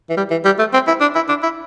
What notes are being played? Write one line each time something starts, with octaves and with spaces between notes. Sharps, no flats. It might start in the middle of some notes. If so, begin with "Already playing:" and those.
E3
G3
E3
G3
A3
C4
E4
D4
E4
D4
E4